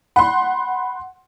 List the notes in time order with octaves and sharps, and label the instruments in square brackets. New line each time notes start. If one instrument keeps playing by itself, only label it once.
[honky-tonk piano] F#5 C6 [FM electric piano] B5